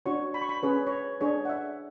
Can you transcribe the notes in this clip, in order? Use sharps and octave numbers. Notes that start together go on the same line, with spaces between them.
D4 F#4 C#5 C#6
B5
C#6
B5
C#4 G#4 B4 C#5
C#5
D4 G#4 C#5
F#5
E5